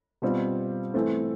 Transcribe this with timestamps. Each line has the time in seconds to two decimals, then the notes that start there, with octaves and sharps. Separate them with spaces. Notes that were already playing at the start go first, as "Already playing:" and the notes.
0.22 B2 G3 C4 F4
0.94 E3 A3 C4